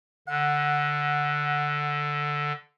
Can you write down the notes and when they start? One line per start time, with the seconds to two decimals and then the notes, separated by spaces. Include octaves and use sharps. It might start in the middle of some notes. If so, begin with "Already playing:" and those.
0.28 D3 F#5